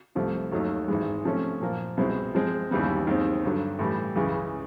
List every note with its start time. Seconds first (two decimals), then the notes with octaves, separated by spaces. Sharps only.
0.15 C2 C3 F3 A3
0.52 D#2 D#3 F#3 A3
0.88 G#1 G#2 E3 G#3
1.25 C3 F3 A3 C#4
1.61 A#2 F3 A#3
1.97 C2 B2 G#3 C4 E4
2.35 F3 G#3 C4
2.71 D#2 C#3 E3 G3 B3
3.07 D#2 D#3 G#3 C4
3.44 G2 D3 F#3
3.79 A2 E3 G3
4.16 C#2 C#3 E3 G#3